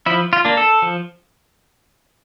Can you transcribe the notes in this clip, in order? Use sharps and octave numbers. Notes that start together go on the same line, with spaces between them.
F3 E4
F4
A#3 D4
A4
F3